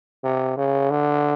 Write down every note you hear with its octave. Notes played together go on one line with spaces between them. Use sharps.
C3
C#3
D3